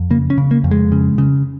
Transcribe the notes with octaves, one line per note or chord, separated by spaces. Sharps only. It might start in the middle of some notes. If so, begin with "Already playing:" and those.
Already playing: F2
C#3 A#3
C#4
C#3
A#3
F2
G#3
C#3
C#3